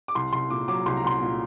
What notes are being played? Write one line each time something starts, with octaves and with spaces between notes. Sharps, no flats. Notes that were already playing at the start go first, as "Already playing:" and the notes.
D6
C2 C6
C2 C6
A#2 D6
F#3 D6
C2 C6
A#5
C2 C6
A#2